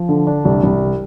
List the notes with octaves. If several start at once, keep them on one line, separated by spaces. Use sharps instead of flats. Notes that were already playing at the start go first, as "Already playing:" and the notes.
Already playing: F3
D3
D4
C2
C2